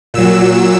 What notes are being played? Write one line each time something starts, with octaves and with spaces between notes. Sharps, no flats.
A#2 F#3 E6